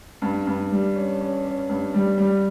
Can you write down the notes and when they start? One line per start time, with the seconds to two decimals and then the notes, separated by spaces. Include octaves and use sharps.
0.22 G2
0.47 G2
0.72 G3
0.96 C#4
1.21 C#4
1.45 C#4
1.69 G2
1.94 G3
2.18 G3